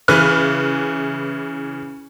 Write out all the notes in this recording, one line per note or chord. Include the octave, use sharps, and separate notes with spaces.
C#3 E3 B4 F6